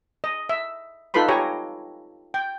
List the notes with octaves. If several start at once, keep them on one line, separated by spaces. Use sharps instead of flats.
D#5
E5
D#4 F4 A4 B4 B5 C6
G4 C#5 G#5 A#5 C#6
G5